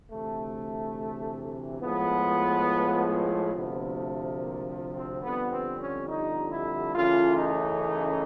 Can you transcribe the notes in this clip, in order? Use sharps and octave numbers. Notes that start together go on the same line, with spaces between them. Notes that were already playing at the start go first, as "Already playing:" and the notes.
D2 C3 E3 A3
A2 F3 G#3 B3
D2 C3 F3 A3 B3
A3
A#3
C4
F2 D3 G3 B3
C4
C#4
D#4
E4
F#2 C#3 E3 A3 F4
D#4